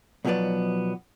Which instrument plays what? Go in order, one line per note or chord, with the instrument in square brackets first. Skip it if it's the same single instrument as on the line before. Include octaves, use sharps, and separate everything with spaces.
[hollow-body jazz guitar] B1 B2 F3 F#3 B3 D5